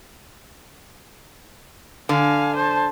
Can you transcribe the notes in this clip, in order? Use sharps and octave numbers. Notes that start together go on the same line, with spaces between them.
D3 F5 G#5
C5 A5